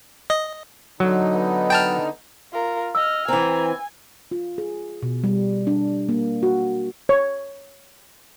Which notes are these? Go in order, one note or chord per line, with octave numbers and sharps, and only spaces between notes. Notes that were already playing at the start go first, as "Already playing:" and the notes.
D#5
D3 F#3 D#4
B3
G5 A5 F6
F4 A#4
D#5 E6 F6
E3 C4 G#5 A#5
F4
G#4
B2
G3
D4
A#3
F#4
C#5